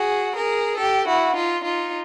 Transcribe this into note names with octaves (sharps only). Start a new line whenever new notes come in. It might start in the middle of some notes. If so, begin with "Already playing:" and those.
Already playing: F#4 G#4
G#4 A#4
G4 A4
E4 F#4
D#4 F4
D#4 F4